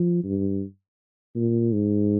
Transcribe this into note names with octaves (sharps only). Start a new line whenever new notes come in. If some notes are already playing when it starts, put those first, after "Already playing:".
Already playing: F3
G2
A#2
G#2